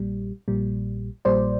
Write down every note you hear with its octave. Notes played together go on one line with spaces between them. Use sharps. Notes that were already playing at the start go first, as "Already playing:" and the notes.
Already playing: A#1 A#2 G3
A#1 A#2 G3
A#1 A#2 G3 C5 D5